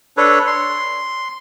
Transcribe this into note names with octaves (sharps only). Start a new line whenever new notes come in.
D4 A4 B4 C#5
C6